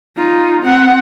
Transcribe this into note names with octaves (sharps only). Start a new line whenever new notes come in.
D#4 F4
C4 F#5